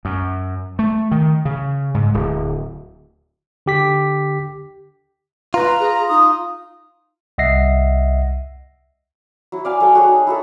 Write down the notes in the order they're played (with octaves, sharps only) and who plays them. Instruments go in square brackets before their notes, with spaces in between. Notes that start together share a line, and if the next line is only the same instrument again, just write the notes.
[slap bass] F#2
A3
D#3
C#3
G#2
D1
[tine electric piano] D3 G4 B6
[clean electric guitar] F4 [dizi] B4 [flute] A#5
[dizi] G#4
[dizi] D#4 [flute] D#6
[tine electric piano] C2 D#5 E5 F#5 A#6 C7
[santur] F#3 E4
D5 F5 G#5
F#3 A4 F5 G5
F#4 G#4 C#5
D#4
E4 F#4 A4